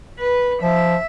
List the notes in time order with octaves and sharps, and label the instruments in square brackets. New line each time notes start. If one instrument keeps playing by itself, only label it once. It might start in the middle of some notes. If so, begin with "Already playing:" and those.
[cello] B4
[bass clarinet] F3 [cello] E5